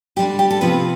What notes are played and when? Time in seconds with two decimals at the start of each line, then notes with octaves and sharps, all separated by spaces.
0.16 D3 G3 B3 G4
0.39 G4
0.50 A4
0.61 C3 F3 B3 C4 F4 B4